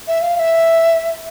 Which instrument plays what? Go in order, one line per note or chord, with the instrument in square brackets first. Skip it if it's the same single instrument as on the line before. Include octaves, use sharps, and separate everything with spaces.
[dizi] E5
F5
F5
E5